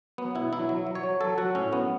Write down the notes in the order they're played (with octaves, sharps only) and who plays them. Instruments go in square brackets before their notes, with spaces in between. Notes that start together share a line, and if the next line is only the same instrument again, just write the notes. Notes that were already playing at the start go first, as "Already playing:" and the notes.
[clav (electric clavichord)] F#3 B3
B2 E4
F#3 E4
F#3
F#3
C#5
F#3
F#3 A4
F#3 F#4
A2 C#4
F#3 B3